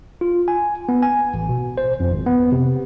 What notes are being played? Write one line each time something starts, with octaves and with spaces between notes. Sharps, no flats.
F4
G#5
B3
G#5
A1
B2
C5
F2
G#1
B3
C3